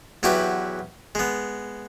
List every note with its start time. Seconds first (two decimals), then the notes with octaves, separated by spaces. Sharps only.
0.23 E2 F#3 E4 F#4 G4 B4
1.15 G#3 B3